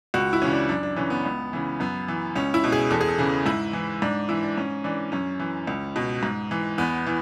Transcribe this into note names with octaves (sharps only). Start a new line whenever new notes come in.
C#2 F#4
E4
C#3 E3 C#4
D4
F#2 D4
D4
C#3 E3 C#4
B3
C#2
C#3 E3
F#2 B3
E3
C#2 C#4
E4
B2
G#4
E2 A4
G#4
A4
C#3 E3
G#2 E4
E3
G#2 D4
E3 E4
D4
G#2 C#4
E3 D4
F#2 C#4
E3
C#2
B2
G#2
E3
E2 B3
E3